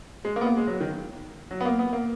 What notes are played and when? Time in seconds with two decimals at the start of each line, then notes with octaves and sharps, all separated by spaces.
0.25 G#3
0.36 A#3
0.41 B3
0.46 A#3
0.57 G#3
0.67 F#3
0.80 D#3
1.51 F#3
1.61 B3
1.65 A#3
1.79 B3
1.93 A#3